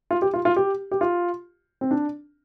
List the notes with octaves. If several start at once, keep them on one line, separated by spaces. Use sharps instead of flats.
F4
G4
F4
F4
G4
G4
F4
C4
D4